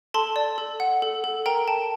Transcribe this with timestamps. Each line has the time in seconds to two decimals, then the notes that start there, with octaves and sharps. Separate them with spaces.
0.14 A4 A5 C6
0.36 D5
0.58 A4
0.80 F#5
1.02 A4
1.24 A4
1.46 A#4 G5 A#5
1.68 G5 A5